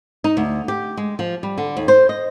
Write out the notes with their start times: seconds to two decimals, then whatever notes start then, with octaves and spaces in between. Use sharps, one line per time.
0.24 D#4
0.37 D2
0.68 G4
0.97 G#3
1.19 F3
1.43 G3
1.58 D3
1.77 D#2
1.88 C5
2.09 D#5